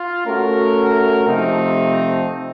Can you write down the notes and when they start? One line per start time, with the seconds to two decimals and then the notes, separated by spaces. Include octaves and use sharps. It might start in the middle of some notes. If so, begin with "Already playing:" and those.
Already playing: F4
0.26 A3 C#4 F#4 A#4
1.27 C3 F3 A3 C4 D#4